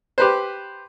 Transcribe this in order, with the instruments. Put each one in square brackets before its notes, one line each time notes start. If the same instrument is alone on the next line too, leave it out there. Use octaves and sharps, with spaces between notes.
[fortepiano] G4 B4 C5